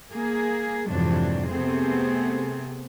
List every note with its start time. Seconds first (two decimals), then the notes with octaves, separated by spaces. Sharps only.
0.12 A#3 G#4
0.88 F2 G#2 C3 E3 F#3 D4
1.49 C3 A3 B3 C4 G#4